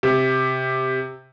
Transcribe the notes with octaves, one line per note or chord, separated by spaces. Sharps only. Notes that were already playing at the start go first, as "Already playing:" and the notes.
C3